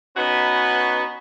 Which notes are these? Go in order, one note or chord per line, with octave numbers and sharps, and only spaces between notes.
B3 C#4 D#4 F#4 B4